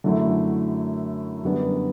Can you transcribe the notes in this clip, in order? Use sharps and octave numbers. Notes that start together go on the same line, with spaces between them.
F#2 D3 F#3 A3 E4
F#2 D3 G3 B3 D4